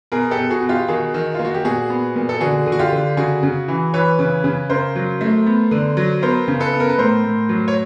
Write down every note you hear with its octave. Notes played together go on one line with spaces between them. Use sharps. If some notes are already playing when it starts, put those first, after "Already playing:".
B2 G#4 A#4
G4 A4
B2
F#4 G#4
B2
F4 G4
D#3 F#4 G#4
D#3
A#3 F4
F#4
G4
A#2 F#4 G#4
B3
A#2
A4
D3 F#4 G#4
D3
F#4
F4 G4
D3
C#3 F#4 G#4
C#3
E3
E3 B4 C#5
C#3
C#3
C#3 A#4 C5
F#3
A3
B3
D3
F#3
B3 A#4 C5
C#3
A4 B4
B3
A#4
B4
A2 A#4 C5
A2
F#3
C#5